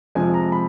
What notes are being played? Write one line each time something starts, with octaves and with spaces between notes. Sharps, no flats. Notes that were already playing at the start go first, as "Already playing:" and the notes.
F2 C3 F3 G#3 G#5
A#5
B5